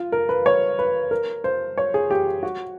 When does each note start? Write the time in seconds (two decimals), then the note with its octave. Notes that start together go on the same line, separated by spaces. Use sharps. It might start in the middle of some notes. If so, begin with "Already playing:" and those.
Already playing: F4
0.12 A#4
0.29 B4
0.46 C#5
0.79 B4
1.11 A#4
1.44 C5
1.78 C#5
1.94 G#4
2.10 G4
2.43 F#4